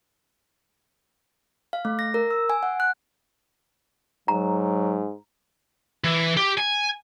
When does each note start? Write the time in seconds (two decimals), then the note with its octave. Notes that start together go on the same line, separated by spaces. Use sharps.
1.73 F5
1.85 A3
1.99 A#6
2.14 A#4
2.31 E6
2.50 G#5
2.63 F#5
2.80 F#6
4.28 G#2 F#3 A#5
6.04 E3
6.37 G4
6.58 G#5